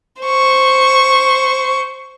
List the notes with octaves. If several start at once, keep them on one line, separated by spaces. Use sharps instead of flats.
C5 C#6